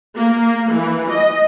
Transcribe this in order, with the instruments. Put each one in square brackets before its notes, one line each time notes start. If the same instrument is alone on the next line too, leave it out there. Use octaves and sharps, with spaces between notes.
[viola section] A#3
E3
D#5